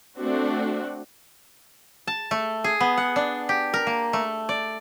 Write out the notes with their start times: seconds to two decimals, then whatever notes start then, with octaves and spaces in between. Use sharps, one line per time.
0.17 A3 C4 D4 F#4
2.07 A5
2.31 A3
2.64 G#4
2.80 B3
2.97 F#5
3.16 D4
3.49 G4
3.74 A#4
3.87 A#3
4.13 A3
4.49 D5